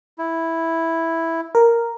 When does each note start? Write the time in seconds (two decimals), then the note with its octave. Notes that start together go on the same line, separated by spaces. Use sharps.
0.18 E4
1.55 A#4